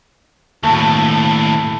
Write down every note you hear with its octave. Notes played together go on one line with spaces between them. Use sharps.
D#2 A2 A3